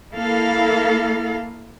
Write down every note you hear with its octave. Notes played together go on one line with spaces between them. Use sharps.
A#3 E4 A4 F5